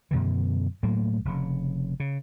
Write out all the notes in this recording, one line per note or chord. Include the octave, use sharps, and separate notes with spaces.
F#2 B2 D3 E3
A2 F#3 A3 A#3
F1 C#3
C#3